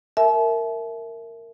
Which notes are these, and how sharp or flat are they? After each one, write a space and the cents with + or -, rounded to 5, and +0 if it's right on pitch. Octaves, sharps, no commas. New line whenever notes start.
A#4 -15 E5 +0 A5 -40